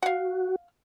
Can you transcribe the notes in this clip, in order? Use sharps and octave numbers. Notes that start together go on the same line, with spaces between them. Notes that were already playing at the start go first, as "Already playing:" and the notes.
F#4 F5 F#5